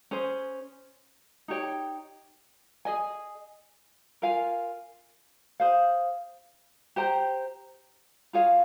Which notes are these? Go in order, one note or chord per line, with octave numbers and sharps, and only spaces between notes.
C#4 G#4 C5
D#4 G4 C#5 G5
G#4 D#5 G#5
F4 A#4 F5 G#5
G#4 C5 F5
G4 C5 G5 A#5
F4 G#4 C#5 F5